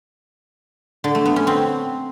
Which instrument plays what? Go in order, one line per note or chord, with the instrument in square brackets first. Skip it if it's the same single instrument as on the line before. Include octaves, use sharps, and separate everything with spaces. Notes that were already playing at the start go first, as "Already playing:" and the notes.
[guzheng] D3
A3
B3
C#4
C4